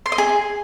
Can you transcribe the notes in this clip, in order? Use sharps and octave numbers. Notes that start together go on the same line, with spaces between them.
C6
D#5
G#4